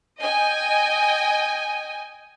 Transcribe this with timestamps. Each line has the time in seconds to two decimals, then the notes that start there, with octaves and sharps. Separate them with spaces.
0.20 D#5 G5 G#5